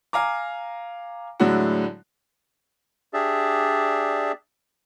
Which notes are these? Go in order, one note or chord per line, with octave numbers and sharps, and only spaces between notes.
F5 G#5 A#5 D6
A2 D3 F#3 G#3 E4 F#4
D4 G4 G#4 D5 E5